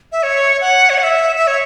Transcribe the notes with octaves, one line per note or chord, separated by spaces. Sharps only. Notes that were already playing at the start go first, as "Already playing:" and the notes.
E5
C#5
F#5
C#5
F#5
E5
E5
C#5